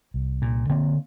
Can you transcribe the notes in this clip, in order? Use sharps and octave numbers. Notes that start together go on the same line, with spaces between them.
C2
A#2
D3 A#3 C4